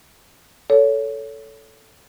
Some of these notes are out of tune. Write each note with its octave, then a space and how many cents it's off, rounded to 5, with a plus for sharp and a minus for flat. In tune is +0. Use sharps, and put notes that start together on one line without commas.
A4 +0 C#5 +25